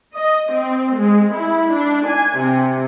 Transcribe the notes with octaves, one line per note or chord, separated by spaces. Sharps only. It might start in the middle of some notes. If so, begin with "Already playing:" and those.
D#5
C4
G#3
E4
D4
G#5
C3